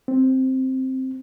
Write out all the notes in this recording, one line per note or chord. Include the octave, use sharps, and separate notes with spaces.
C4